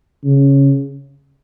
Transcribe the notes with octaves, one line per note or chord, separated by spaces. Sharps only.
C#3